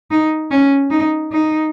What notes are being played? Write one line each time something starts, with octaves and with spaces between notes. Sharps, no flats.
D#4
C#4
D#4
D#4